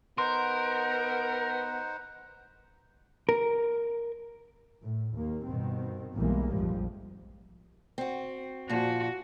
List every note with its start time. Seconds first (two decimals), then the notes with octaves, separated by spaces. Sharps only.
0.18 B3 D#4 A#4 C5 F#5 C6
3.29 A#4
4.82 A2
5.17 D#2 A#3
5.47 G2 B2 D#3 C4
6.15 B1 E2 E3 G3 G#3 A#3
6.52 F1 A#1 F2 G#2 F3 G3
7.98 C4 F#4
8.69 A#2 F3 F#4